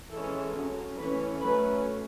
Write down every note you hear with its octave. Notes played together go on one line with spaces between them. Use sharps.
E3 G#3 C#4 A4
F#3 C#4
E3 A3 C#4 B4
F#3 A3 C#4 B4